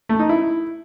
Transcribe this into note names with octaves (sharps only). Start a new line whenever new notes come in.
A3
D#4
E4